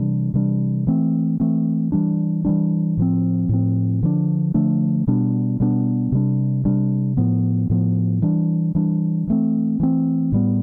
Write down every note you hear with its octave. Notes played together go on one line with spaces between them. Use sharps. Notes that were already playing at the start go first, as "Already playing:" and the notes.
Already playing: C3 E3 G3 D4
C3 E3 G3 D4
E3 A3 C4
E3 A3 C4
E3 G3 D4
E3 G3 D4
A2 F3 C4
A2 F3 C4
D3 F3 A3 D4
D3 F3 A3 D4
B2 G3 B3 D4
B2 G3 B3 D4
C3 G3 D4
C3 G3 D4
A2 F3 B3
A2 F3 B3
E3 G3 D4
E3 G3 D4
E3 A3 C4
E3 A3 C4
A2 G3 B3